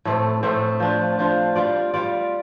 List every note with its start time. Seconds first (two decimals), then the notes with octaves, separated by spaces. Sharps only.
0.05 A2 A3 C4 A4
0.43 A2 A3 C4 A4
0.80 F3 D4 F4
1.19 F3 D4 F4
1.55 G3 F4 D5
1.94 G3 F4 D5